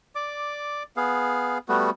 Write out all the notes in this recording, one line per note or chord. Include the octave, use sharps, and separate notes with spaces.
D5 D6
B3 G#4 F5
G3 A3 B3 F#4